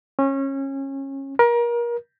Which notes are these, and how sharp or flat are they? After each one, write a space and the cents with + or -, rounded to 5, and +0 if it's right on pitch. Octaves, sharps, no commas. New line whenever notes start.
C#4 -25
A#4 +30